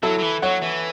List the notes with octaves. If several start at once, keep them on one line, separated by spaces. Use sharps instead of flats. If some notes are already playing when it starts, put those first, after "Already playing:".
F#3 E4 A4
F#3
E3
F#3 C#5 F#5
E3